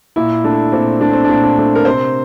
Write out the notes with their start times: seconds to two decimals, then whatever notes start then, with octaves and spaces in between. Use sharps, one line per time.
0.16 A#2 E4
0.44 A3 D4
0.72 A#2 C4
1.01 A3 D4
1.13 C4
1.25 A#2 D4
1.44 D4
1.58 A3
1.75 A#4
1.85 C3 C5